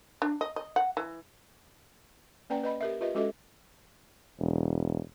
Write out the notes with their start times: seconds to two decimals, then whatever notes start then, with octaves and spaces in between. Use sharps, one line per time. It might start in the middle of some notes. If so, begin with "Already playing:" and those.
0.22 D4
0.41 D#5
0.56 D#5
0.76 F#5
0.97 E3
2.50 A#3 C#4 B4 D5 G5 A#5
2.63 B4 D#5 B5
2.81 G4 A#4 E5
3.01 F4 G4 B4 D#5 E5
3.15 G#3 C#4 F#4 A4 D#5 E5
4.39 E1